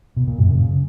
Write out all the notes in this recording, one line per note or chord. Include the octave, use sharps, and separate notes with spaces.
B2
A#2
F#2
C#3